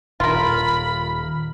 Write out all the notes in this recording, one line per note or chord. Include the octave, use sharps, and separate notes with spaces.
D#1 F4 A#4 B5